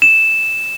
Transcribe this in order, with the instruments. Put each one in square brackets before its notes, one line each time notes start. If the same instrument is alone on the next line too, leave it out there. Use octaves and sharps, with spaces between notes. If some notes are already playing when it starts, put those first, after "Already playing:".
[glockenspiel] E7